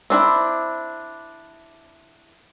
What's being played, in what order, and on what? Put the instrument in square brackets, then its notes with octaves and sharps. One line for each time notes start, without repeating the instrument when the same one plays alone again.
[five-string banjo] C4 D4 E4